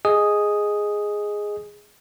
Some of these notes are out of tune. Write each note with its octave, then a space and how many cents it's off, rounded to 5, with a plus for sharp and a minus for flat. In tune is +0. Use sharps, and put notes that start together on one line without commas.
G#4 +0 D#5 +0 D#6 +0